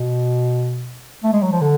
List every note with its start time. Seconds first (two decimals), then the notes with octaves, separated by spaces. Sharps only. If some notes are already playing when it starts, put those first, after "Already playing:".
Already playing: B2
1.24 A3
1.33 G#3
1.43 F#3
1.52 F3
1.61 D3